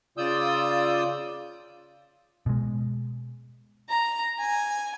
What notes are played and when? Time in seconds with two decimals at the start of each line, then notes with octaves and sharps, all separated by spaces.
0.18 C#3 F4 D5 D#6 E6 G6
2.46 B2 G#3
3.89 A#5
4.39 G#5